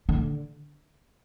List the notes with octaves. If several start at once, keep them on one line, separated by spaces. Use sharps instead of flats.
D3